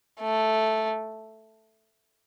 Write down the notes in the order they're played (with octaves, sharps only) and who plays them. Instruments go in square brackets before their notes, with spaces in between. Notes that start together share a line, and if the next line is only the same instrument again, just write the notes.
[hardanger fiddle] A3